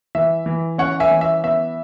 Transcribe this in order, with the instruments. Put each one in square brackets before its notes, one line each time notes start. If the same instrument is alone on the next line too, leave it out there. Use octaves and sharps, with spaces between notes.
[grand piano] E3 E5
E3
C#4 C#5 F#5
E5 G#5
E3
E5
B3 E5